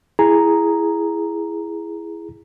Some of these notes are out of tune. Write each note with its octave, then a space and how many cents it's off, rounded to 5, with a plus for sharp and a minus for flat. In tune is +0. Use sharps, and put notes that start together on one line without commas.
E4 +15 G#4 +0 A#5 +0